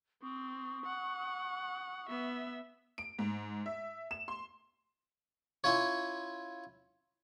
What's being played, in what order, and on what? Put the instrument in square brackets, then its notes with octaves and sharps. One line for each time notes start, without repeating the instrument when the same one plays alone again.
[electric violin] C4 [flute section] C#6 D#6
[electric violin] F#5
B3 E5
[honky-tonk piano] D7
G#2
E5
E7
C6
[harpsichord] C#4 E4 F4 C#5